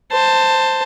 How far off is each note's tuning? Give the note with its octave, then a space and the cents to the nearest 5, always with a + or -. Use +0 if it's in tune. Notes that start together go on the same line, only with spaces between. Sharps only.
C5 +0 A5 +15